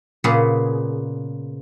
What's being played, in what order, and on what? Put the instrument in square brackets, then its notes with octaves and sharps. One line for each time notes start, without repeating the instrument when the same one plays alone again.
[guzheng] A#2 C#3 B3 G#4